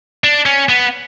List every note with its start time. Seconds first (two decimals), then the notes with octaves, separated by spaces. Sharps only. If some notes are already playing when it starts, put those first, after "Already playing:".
0.24 D4
0.46 C#4
0.69 B3